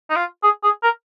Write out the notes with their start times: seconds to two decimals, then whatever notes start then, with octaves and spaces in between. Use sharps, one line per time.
0.10 D#4
0.16 F4
0.43 G#4
0.63 G#4
0.83 A#4